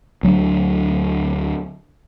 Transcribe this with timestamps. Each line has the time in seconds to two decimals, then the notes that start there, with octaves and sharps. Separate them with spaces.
0.23 D2 F#3 C#4 D4